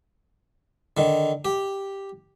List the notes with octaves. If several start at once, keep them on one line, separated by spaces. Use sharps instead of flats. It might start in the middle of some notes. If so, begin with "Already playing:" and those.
D3 D#3
G4